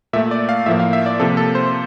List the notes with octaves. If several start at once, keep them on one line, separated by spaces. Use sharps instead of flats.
A#2 A3 E5
D5
F5
A2 F3 A#3 E5
F5
E5
D5
C3 F3 A#3 A4
A4
C5